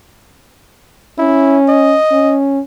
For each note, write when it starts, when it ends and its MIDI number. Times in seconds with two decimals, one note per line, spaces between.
1.19 1.96 61
1.19 1.58 64
1.69 2.36 75
2.12 2.60 61